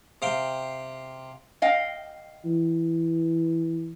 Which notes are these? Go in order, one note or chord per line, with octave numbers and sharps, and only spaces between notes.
C3 F5 G5
D#5 F5 G5
E3